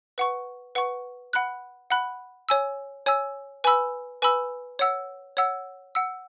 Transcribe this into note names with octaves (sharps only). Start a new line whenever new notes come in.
B4 F#5 C#6
B4 F#5 C#6
F#5 B5 F#6
F#5 B5 F#6
C#5 G#5 E6
C#5 G#5 E6
B4 G#5 B5 E6
B4 G#5 B5 E6
C#5 F#5 E6
C#5 F#5 E6
F#5 E6